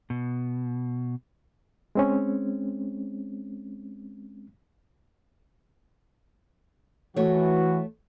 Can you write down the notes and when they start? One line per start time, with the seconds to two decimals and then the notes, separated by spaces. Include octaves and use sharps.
0.10 B2
1.95 G#3 C4 C#4
7.16 E3 A3 F#4 C#5